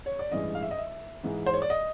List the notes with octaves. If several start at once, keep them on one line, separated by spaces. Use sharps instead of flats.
C#5
D5
A1 G2 E3 G#3 D#5
F5
E5
D#5
E5
G#2 E3 G#3
C5
C#5
D5
D#5